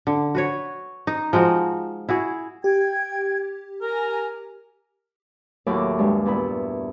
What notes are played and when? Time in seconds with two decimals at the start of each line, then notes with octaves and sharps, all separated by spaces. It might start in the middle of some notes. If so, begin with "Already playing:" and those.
0.07 D3
0.35 F#4 B4 C#5
1.07 D#4
1.33 F3 G#3 D#4 F#4
2.09 E4 F#4 G#4
2.64 G4 G5 G#6
3.82 A#4 G#5 A#5
5.66 D#2 A2 F#3 E4 D6
5.99 G2 G#3
6.25 E2 A#2 E4 B5